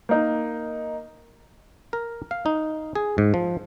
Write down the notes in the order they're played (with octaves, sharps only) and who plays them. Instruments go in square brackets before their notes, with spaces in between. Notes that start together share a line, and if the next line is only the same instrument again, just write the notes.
[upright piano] A#3 D#4
[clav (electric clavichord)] A#4
F5
D#4
G#4
G#2
F3